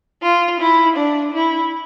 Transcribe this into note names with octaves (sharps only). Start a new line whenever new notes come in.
F4
E4
D4
E4